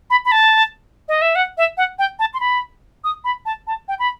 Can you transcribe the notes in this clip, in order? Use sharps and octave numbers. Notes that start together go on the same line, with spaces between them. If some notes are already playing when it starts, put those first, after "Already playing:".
B5
B5
A5
D#5
E5
F#5
E5
F#5
G5
A5
C6
B5
D#6
B5
A5
A5
G5
B5